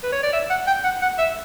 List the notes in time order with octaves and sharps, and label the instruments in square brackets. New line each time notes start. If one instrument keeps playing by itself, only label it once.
[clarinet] B4
C#5
D5
E5
F#5
G5
F#5
F#5
E5